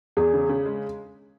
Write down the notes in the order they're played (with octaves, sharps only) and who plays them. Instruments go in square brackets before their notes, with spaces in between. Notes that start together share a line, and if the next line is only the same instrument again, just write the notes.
[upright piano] E2 [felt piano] G#4
[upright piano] C#3
C#3
G#3